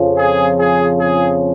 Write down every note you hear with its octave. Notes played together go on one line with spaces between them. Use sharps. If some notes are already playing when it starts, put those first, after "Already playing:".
Already playing: F2 C#3 F3
G#4
G#4
G#4